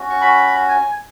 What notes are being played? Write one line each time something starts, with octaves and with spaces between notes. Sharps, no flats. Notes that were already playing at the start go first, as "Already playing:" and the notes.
Already playing: C#4 F#4
C#6
B5
G#5